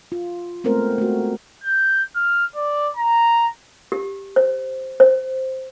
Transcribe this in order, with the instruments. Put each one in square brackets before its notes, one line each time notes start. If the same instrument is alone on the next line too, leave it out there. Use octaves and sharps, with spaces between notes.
[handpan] F4
G#3 A3 B3 C4 A#4 C5
A3 F#4
[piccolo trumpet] G6
F6
D5
A#5
[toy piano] G4
C5
C5